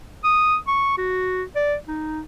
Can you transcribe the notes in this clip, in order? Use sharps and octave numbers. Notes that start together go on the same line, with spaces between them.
D#6
C#6
F#4
D5
D#4